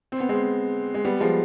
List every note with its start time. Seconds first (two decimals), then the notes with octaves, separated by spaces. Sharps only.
0.12 C4
0.20 B3
0.29 G#3 C4
0.94 G#3
1.05 G3 B3
1.20 F3 G#3